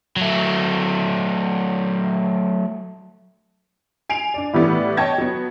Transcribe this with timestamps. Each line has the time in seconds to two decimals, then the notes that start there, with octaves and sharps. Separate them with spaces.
0.16 F#3 A3
4.09 G#5 C7 D7 F7
4.34 D4 D5
4.53 A2 E3 G3 B3 E4
4.97 C#5 D#5 G5 A5 G#6 A#6
5.18 F#3 B3